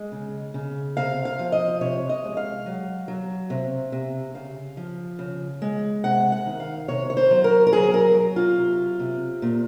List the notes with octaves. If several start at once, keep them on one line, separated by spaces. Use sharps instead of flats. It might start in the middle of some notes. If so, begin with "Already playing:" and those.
Already playing: G#3
C#3
C#3
C3 F5
F5
F3
D#5
C3 C#5
D#5
G#3
F5
F#3
F#3
C3
C3
C#3 F5
F3
C#3
G#3
C3 F#5
F#5
D#3
F5
C3 C#5
C#5
C5
F#3
A#4
A#4
F#3 G#4
A#4
F#3
F4
C3
C3
A#2